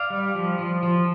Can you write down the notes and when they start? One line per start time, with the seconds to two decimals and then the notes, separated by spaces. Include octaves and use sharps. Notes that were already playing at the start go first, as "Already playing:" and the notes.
Already playing: D5 F5
0.10 G3
0.35 F3
0.59 F3
0.83 F3